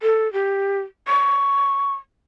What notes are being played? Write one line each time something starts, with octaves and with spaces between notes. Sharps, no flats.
A4
G4
C#6